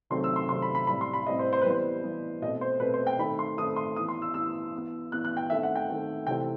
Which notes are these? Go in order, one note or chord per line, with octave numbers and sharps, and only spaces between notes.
C3 D#3 F#3 A3 C4 C6
E6
C6
C3 D#3 F#3 A3 C4 C6
B5
B5
A2 G3 C4 B5
C6
B5
A2 G3 C4 D#5
C5
C5
E3 G3 B3 B4
C5
E3 G3 B3
B2 A3 C4 D#5
C5
B2 A3 C4 B4
C5
G5
D#3 A3 C4 B5
C6
D#3 A3 C4 D#6
C6
E3 B3 D#6
C6
E6
E3 B3 E6
E3 B3
E3 B3 F#6
F#6
G5
D#3 A3 C4 E5
F#5
G5
D#3 A3 C4
C3 E3 A3 C4 G5